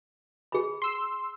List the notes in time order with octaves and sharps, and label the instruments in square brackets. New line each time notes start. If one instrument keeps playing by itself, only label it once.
[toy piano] G#4 B5
[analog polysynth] C6 E6